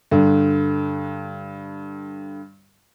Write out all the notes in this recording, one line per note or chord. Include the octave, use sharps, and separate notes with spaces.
G2 D3